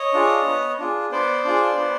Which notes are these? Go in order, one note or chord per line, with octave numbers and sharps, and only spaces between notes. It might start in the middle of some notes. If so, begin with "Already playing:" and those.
Already playing: C#5 D#5
D4 F4 G#4
B3
D4 F4 G#4
B3 C5 D5
D4 F4 G#4
B3